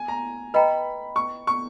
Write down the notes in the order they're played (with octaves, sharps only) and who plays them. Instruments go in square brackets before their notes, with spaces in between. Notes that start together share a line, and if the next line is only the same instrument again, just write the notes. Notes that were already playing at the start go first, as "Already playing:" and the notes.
Already playing: [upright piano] G#5
A#5
[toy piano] B4 D#5 G5 A#5 [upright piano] B5
[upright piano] C#6
C#6